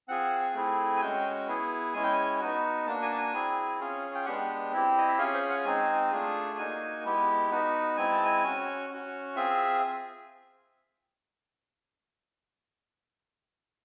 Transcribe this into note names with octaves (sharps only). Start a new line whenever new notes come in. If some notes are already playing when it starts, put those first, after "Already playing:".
C4 F4 G#4 F#5
A3 C4 E4 G#4
G#5
G#3 C#4 F#4 G5
B3 E4 G#4
G#3 C#4 E4 G#5
G5
G#5
B3 D#4 F#4
A#3 D4 F#4 A5
G#5
A5
G#5
C4 E4 G#4
C#4 F4 G#4
G5
G#3 B3 D4 G4 F#5
C4 E4 G4
D#5
E5
C#4 F4 G#4 F5
C5
F#5
G#3 C4 D#4 G#5
A3 D4 F4 G#4
A#3 D#4 F#4 G#5
G#3 B3 E4 G4
B3 D#4 F#4
G#3 C4 E4 G#5
A5
G#5
C#4 F#4
C#4 F#4
C4 F4 G#4 E5